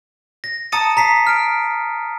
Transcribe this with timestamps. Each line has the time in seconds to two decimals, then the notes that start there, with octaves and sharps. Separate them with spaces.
0.44 A#6
0.72 A5 A#5 D#6 A6 C#7 D#7
0.97 A#5 B6 C7
1.27 F6 D7